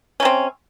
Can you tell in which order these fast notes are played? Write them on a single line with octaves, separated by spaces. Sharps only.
C#4 C3 C4